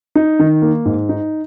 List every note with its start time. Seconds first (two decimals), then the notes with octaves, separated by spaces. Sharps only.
0.15 D#4
0.39 D#3
0.62 A#3
0.86 G#2
1.09 D#4